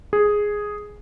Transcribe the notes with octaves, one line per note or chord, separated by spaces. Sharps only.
G#4